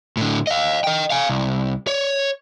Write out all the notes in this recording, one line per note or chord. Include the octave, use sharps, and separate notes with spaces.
A2 D3
D#5 F5
D#5 G5
F5 G#5
C2
C#5